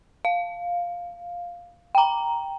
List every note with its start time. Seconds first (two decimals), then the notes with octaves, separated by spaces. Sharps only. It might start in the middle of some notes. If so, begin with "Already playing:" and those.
0.25 F5
1.95 G5 A#5